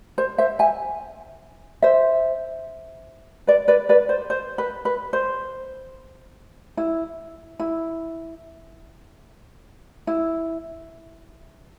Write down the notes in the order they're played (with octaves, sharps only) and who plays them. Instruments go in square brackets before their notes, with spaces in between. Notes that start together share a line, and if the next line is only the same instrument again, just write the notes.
[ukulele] C5
C5 E5
E5 G#5
C5 E5
B4 D5
B4 D5
B4 D5
C5
C5
B4
B4
C5
E4
E4
E4